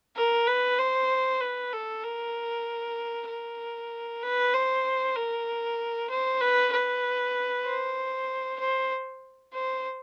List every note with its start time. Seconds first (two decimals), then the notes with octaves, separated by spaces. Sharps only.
0.16 A#4
0.47 B4
0.79 C5
1.40 B4
1.73 A4
2.04 A#4
3.28 A#4
4.23 B4
4.54 C5
5.16 A#4
6.10 C5
6.40 B4
6.73 B4
7.66 C5
8.60 C5
9.54 C5